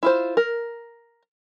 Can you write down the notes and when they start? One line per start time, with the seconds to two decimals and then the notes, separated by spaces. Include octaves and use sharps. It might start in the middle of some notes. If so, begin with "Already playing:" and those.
0.03 E4 F4 C5
0.37 A#4